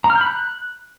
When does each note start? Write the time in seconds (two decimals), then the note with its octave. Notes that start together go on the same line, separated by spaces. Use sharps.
0.04 A#5
0.10 F6
0.15 G6
0.21 B5
0.27 F#6